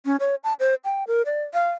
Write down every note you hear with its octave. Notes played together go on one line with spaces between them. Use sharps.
C#4
C#5
A5
C5
G5
A#4
D5
F5